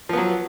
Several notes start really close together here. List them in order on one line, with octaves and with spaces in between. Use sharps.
F3 B3 F#3